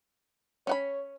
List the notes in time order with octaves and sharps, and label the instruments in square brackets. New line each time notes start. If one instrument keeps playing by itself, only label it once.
[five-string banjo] C#4 F#5 B5 [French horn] C#5